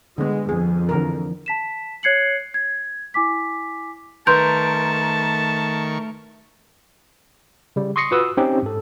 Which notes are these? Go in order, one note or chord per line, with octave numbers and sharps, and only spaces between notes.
D3 G#3 B3
F2 G#4
D3 E3 A#4
A5 B6 E7
C#5 F#6 G#6 C7 C#7 F#7
G#6
E4 G#5 D6 B6
D#3 A3 A#4 B4 A5 C6 C#6 G6
C#3 G3
C6 C#6 D#6 A#6 C7 C#7
F4 F#4 B4 D#6 E6
C4 C#4 D#4 G4
G#2 A4